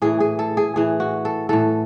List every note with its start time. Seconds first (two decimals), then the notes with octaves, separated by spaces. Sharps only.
0.02 A2 E3 G#4
0.20 G#4
0.39 A4
0.57 G#4
0.76 A2 E3 G#4
1.00 F#4
1.25 A4
1.49 A2 E3 A4